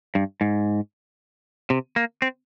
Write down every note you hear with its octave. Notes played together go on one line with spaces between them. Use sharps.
G2
G#2
C3
A#3
C4